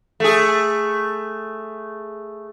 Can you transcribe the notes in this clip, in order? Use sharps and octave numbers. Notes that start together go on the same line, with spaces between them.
A3 G#4